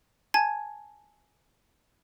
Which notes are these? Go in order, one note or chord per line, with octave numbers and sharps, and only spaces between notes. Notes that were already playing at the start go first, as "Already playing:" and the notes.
G#5 A5 G#6